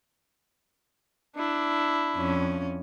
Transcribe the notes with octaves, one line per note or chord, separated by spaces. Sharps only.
D4 E4
F2 C#4